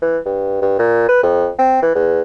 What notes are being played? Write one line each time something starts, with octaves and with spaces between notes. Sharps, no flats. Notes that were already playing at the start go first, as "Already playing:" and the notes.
E3
G2
G2
A#2
B4
F2
C4
E3
E2